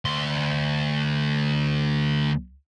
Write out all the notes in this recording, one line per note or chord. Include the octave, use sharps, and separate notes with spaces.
D2 C6